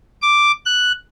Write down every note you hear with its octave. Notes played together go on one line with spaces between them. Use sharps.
D6
F#6